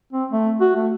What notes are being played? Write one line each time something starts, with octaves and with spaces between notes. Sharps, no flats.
C4
A3
F#4
A3